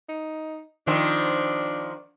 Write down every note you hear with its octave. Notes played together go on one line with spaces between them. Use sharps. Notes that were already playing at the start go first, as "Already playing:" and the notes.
D#4
D#3 F3 C4 D4